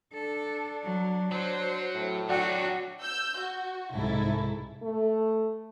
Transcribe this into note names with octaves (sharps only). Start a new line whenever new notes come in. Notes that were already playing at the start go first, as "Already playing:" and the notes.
D4 A4
F#3
F#3 C5
A2
F#3 D4 F#4 D5 F#5 G5
E6 G6
F#4
C2 G#2 E4 A4
A3